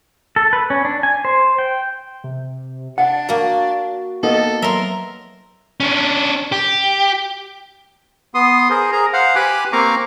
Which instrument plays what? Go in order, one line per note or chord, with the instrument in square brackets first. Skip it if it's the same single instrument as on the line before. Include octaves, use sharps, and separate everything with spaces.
[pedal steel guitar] A4
B4
C#4
D4
G#5
C5
G5
[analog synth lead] C3
[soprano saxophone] D4 [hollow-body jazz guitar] F#5
[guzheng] A#3 A#5 [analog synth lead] F#4
[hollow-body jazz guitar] A#3 B3 D#4 [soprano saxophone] A4
[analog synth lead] F#3 [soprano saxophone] A#4 [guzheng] E5 C6
[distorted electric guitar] C#4 D4
G4
[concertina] B3 C6 D#6
G#4 A#4 C5
G#4 A#4 A#5
C5 F5 F#5
G4 B4 G#5 B5 D6 F#6
A#3 C4 F5 A#5 C#6 D6